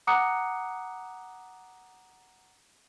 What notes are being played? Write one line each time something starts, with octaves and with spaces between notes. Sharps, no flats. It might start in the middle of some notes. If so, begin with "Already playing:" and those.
F#5 A#5 D6 D#6 F#6 C#7